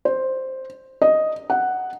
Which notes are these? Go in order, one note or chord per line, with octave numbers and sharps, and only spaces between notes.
C5
D#5
F#5